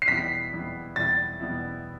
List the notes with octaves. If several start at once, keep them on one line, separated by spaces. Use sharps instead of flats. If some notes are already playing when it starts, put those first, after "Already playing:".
C7
E2 B2 G3 B3 E4 B6
E2 B2 G3 B3 E4
E2 B2 G3 B3 E4 A6
E2 B2 G3 B3 E4